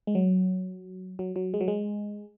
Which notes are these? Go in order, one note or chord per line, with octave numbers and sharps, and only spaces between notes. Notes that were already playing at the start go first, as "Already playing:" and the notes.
G#3
F#3
F#3
F#3
G#3
F#3
G#3